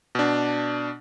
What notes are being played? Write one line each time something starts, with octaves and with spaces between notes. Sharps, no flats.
B2 D4